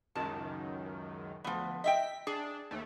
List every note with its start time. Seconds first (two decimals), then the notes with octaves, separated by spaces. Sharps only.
0.15 C#2 F#2 D#3 A5
1.44 D2 F3 B3
1.84 D#5 E5 G5 B6
2.27 D4 G#4
2.71 D#2 A3